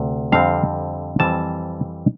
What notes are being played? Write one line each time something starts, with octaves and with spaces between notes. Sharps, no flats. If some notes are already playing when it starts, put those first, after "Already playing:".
Already playing: D2 C3
F2 D3 G3 C4 F5
F2 E3 G3 C4 A5